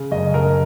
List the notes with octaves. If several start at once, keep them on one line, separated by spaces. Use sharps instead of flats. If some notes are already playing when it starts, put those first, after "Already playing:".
Already playing: C#3
F#1 D#5
F#1 A#4